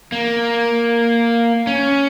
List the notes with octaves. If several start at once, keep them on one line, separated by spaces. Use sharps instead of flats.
A#3
C#4